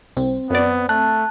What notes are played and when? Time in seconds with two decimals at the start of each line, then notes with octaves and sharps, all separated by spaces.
0.17 C2 C4
0.50 F#2 B3 D5
0.89 A3 A5 F#6